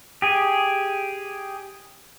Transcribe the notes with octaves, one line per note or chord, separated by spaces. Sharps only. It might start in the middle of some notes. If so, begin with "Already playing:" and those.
G4 G#4